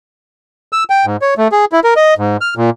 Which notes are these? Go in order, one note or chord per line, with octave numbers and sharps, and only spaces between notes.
E6
G5
G#2
C#5
A3
G#4
E4
A#4
D#5
G#2
F6
A#2